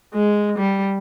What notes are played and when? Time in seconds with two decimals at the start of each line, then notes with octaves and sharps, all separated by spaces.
0.14 G#3
0.58 G3